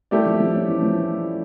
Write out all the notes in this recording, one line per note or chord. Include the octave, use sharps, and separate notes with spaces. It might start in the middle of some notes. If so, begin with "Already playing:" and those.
G3 A3 E4 G4 D5
F3
F3
C#4
E3
F3